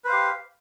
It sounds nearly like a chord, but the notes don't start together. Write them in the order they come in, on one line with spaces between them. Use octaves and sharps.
B4 C5 F5 G4